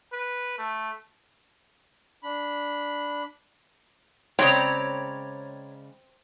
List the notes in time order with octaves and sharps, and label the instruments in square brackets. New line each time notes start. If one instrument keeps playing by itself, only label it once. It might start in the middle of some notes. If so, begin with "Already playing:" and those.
[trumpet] B4
A3
[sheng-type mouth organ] D4 B5
[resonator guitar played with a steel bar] C#3 G#3 G5 [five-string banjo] C4 [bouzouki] C#5 A#5 [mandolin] D5 B5